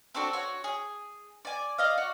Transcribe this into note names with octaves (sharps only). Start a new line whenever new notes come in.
C4 D4 F#4 A4
F#4 C#5
G#4
D5 G#5
D5 D#5 F5
F#4